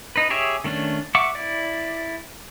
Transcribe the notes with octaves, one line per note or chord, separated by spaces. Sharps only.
D#4 B4
G4 G#4 C#5 E5
D#3 A3 C#4 D4
E5 F#5 C#6 D6
E4 D5